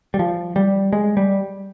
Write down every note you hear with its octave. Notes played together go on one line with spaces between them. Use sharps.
G3
F3
G3
G#3
G3